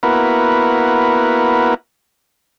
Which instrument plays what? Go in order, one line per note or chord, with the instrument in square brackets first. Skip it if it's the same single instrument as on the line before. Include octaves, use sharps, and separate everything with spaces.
[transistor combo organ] A#3 B3 E4 F#4 A#4 B4